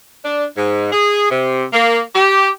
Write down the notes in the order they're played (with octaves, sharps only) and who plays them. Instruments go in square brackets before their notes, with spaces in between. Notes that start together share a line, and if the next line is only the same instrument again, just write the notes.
[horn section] D4
G#2
G#4
C3
A#3
G4